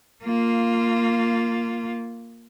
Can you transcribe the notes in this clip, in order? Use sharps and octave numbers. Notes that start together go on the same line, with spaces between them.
A#3 F4